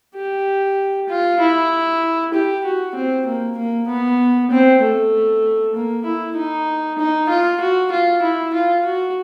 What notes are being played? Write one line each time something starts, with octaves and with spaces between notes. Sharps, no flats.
G4
F4
E4
G4
F#4
C4
A#3
A#3
B3
C4
A3
A#3
E4
D#4
D#4
F4
F#4
F4
E4
F4
F#4